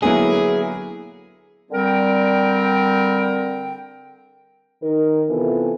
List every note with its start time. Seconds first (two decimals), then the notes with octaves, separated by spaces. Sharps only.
0.03 D3 F#3 A#3 B3 E4 G#4
1.71 D3 G3 C4 A#4 G5
4.82 D#3 D#4 A#4
5.30 C3 E3 B3 E4 F4 A4